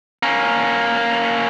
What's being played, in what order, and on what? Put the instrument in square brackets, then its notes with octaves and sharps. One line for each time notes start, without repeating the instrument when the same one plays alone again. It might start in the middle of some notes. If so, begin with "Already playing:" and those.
[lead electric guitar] A#3 C#4